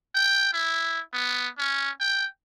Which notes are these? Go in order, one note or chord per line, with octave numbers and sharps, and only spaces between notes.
G5
E4
B3
C#4
G5